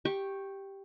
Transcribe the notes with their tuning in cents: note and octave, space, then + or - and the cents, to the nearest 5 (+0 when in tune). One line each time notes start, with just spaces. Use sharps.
G4 +0 C#6 -15